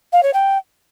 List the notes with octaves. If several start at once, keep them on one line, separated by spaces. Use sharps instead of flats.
F5
C#5
G5